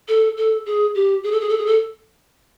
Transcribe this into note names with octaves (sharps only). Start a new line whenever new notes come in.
A4
A4
G#4
G4
G#4
A4
G#4
A4
G#4
A4